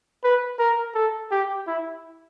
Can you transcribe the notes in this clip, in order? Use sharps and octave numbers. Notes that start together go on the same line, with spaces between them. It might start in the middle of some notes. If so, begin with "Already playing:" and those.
B4
A#4
A4
G4
E4